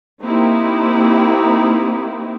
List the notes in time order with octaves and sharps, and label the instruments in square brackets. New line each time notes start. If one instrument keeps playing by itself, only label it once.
[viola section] A#3 C4 D#4 E4 G4